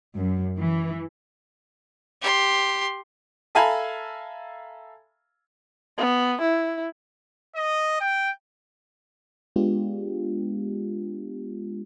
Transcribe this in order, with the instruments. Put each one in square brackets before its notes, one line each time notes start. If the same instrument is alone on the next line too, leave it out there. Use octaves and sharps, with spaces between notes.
[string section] F#2
E3
[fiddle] G4 C6
[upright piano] A4 E5 F5 G#5 A#5 B5
[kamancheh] B3
E4
[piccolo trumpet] D#5
G5
[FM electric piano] G#3 B3 D4 F4 G4